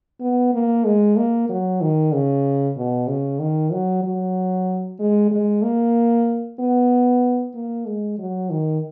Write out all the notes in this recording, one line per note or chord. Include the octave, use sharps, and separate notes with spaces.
B3
A#3
G#3
A#3
F#3
D#3
C#3
B2
C#3
D#3
F#3
F#3
G#3
G#3
A#3
B3
A#3
G#3
F#3
D#3